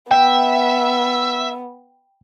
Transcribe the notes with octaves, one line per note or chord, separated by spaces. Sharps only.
B3 E5 G5